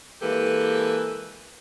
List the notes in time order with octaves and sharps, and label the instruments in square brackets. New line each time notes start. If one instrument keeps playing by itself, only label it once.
[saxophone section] E3 G#3 A#3 G4 A4 B4